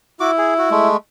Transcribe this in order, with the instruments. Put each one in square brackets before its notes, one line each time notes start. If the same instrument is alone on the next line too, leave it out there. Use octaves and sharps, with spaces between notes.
[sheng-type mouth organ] E4 [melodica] F#4 D6
[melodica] G#4
F#4
G#3 A3